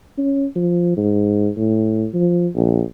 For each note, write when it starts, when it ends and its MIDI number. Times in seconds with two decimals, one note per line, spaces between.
0.18 0.46 61
0.56 0.96 53
0.97 1.49 44
1.57 2.06 45
2.14 2.48 53
2.55 2.82 34